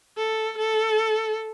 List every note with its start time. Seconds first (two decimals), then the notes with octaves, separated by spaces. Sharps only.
0.17 A4
0.57 A4